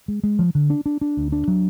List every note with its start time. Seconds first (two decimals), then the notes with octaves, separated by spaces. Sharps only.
0.08 G#3
0.24 G#3
0.39 F3
0.55 D3
0.70 D4
0.86 D4
1.01 D4
1.17 D2
1.32 D4
1.48 F#3